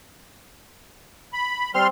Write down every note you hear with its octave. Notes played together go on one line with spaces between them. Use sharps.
B5
G3 C4 C6 F6